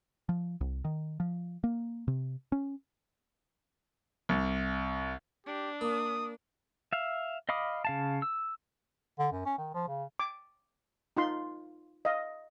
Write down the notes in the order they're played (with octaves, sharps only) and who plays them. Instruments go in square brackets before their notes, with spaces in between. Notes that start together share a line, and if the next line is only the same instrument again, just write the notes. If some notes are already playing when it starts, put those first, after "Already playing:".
[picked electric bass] F3
C2
D#3
F3
A#3
C3
C#4
[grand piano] C2
[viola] D4 [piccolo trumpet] G4
[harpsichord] A#3 [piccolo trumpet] D#6
[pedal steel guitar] E5 F5
D#5 F5 B5 D6 D#6
C#3 F5 A5
E6
[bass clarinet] D3
F#2
C#4
D#3
F3
C#3
[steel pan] D6
D#4 F4 C6
D#5 F5